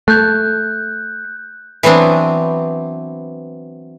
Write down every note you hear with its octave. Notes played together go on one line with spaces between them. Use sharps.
A3 F#6 G6
E3 F#3 B3 C4 D4